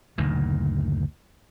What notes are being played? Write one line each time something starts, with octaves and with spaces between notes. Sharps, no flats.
F#1 D2 A#2 D#3